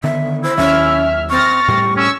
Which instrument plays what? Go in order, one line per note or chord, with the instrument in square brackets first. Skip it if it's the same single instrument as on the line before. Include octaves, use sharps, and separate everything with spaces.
[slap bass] D3 D#3 B3 [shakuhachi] E5
[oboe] E4 [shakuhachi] C5
[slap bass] D#2 D#3 F#3 [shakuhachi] C#4 [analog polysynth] E5 F6
[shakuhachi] C4 [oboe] C#6 [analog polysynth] F6 A6 A#6
[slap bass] A2 G3 A3 [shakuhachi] G4
[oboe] C#4 [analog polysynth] C#6 E6